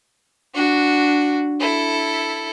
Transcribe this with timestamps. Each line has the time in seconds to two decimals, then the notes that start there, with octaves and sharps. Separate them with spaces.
0.54 D4 F#4
1.60 E4 A4